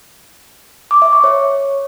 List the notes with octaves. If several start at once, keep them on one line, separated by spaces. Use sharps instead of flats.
D6
E5
C#6
C#5